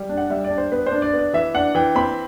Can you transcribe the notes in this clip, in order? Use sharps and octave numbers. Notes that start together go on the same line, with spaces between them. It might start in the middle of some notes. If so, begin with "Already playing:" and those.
Already playing: G3
D4
F#5
G3 E5
D5
D4
C5
B3 B4
C5
D4
D5
B3
D5
E3 E5
D4 F#5
E3 G5
C4 B5